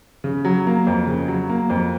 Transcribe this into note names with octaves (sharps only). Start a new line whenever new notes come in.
C#3
F#3
A#3
F2
C#3
F#3
A#3
F2